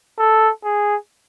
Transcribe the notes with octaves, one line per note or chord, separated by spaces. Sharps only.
A4
G#4